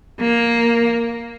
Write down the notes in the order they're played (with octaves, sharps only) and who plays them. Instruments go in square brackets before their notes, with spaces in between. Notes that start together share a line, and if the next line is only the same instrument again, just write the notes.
[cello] A#3